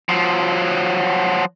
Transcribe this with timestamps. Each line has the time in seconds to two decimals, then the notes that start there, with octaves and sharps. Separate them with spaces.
0.09 F3 F#3